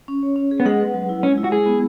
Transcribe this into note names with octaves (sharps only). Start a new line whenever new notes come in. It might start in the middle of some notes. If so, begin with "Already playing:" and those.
C#4
C#5
C#4
G#4
B3
G#3 F#5
B4
F#3
E4
G#3 C#4
E4
F#4
G#3 G#4
B3